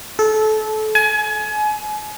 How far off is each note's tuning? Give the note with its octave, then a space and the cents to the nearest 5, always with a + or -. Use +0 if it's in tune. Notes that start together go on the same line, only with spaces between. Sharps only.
A4 -25
G#5 +30